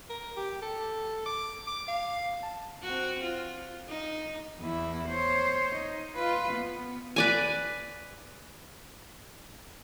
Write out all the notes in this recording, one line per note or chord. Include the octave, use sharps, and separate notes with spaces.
A#4
G4
A4
D6
D6
F5
A5
C4 F#4
F4
D#4
E2 E4
C5 C#5
D#4
F4 B4
B3
B4 D5 G#5